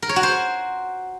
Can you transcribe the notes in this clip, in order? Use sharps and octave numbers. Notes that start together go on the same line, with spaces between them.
A#4
C#5
F#4
C5